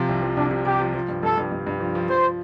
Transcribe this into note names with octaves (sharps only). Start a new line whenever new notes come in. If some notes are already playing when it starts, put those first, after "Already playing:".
Already playing: C3 F3 F4
C2
F3
C2 D4
C3
C3 G4
F3
F3
G2
G2 A4
G2
G2
G2
F3
F3
F3 C5